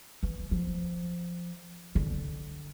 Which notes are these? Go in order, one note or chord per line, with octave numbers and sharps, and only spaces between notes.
E3
F3
D3